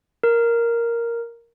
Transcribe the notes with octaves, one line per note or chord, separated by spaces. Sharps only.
A#4